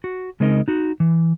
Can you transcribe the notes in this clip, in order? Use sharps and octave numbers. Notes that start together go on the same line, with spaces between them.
F#4
C#3 G#3 C4 D#4 A#4 D#5
D#4 F#4
E3